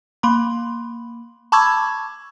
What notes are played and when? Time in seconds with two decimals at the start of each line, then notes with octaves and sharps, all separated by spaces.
0.23 A#3 B5 C6
1.52 A5 B5 C#6 D6 E6 G#6